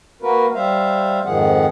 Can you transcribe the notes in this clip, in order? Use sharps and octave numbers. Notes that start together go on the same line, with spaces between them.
A#3 F#4 A#4 B4
G3 C5 E5 F5
F2 G#2 D#3 F3 G#4 F#5